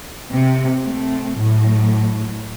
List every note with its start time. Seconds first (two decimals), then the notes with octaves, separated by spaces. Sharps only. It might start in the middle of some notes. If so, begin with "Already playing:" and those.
0.31 C3
0.83 A3 C4
1.38 A2 F#3